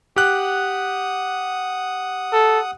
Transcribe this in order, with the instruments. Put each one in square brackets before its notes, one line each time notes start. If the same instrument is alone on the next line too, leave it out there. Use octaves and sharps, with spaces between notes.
[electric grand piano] G4 F#6 [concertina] F#5 D#6
[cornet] A4